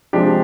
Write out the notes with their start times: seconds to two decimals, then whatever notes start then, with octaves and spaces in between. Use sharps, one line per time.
0.13 C3 F3 G#3 D4 G4